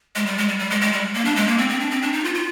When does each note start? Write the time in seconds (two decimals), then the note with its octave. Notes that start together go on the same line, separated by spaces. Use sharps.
0.16 G#3
0.26 G3
0.38 G#3
0.48 G3
0.59 G3
0.70 G#3
0.81 G#3
0.93 G3
1.14 A#3
1.25 D4
1.36 G#3
1.47 A#3
1.58 C4
1.69 C4
1.80 D4
1.91 C4
2.02 D4
2.13 D#4
2.24 F4
2.34 F4